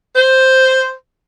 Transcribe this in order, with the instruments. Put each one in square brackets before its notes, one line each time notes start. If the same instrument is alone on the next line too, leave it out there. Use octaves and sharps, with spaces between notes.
[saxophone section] C5